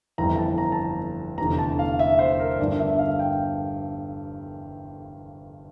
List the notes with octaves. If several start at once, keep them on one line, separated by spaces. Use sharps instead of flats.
G1 F2 E3 A#5
A5
A#5
A5
A#5
F1 E2 D3 A#5
A5
F5
E5
C5
A#4
G1 G2 D3 D5
E5
F5
G5